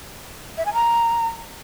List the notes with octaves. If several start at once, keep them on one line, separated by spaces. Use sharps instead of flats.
E5
G#5
A#5